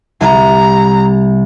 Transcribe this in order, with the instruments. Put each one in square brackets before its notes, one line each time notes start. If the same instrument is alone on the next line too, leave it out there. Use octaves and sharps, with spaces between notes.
[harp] C2 [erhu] A#5